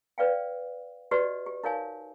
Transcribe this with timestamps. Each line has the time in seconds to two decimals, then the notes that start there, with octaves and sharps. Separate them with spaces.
0.18 B4 D5 F5 G5
1.11 F#4 G4 B4 D5 D#5
1.46 G4
1.63 D#4 A#4 C#5 F5 G#5